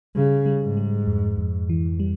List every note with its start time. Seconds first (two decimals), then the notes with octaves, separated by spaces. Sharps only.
0.15 C#3 G3
0.46 G3
0.61 G#2
0.77 G3
1.07 F2
1.38 F2
1.69 E3
2.00 G3